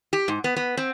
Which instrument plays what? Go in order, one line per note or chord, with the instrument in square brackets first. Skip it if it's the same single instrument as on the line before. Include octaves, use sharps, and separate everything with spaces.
[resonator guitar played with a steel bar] G4
G#2
B3
B3
C4